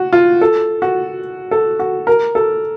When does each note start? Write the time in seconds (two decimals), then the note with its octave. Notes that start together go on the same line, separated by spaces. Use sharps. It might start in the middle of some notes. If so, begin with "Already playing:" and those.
Already playing: F#4
0.13 F4
0.41 A4
0.82 F#4
1.51 A4
1.79 F#4
2.07 A#4
2.35 A4